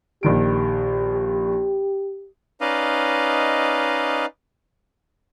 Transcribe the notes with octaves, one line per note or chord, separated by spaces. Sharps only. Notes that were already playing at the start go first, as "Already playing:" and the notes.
A#1 D#3 G4 D7
C#4 D#4 B4 D5 D#5 F5